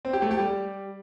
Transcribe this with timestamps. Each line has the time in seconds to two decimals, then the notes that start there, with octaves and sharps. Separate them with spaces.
0.05 C4
0.13 G4
0.22 A3
0.31 G4
0.39 G3